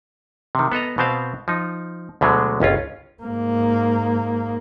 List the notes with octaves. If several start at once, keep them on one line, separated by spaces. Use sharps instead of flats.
C3 D#3
B3 A4 D#5 A#5
B2 B3 C4 C5 F5
F3 D#4
D2 B2 D3 F#3 G#3
G1 C#2 C#4 F4
G#2 A#3